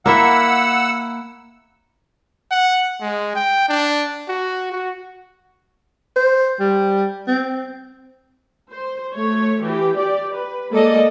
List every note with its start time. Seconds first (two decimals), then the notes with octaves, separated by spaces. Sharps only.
0.06 A#3 E4 E5 F#5 E6
2.51 F#5
3.01 G#3
3.35 G5
3.69 D4
4.29 F#4
4.72 F#4
6.16 C5
6.60 G3
7.27 C4
8.71 C5
9.14 A3 C#5
9.63 E3 G4
9.97 G4 D5
10.35 B4
10.71 G#3 A#3 A4 D5 D#5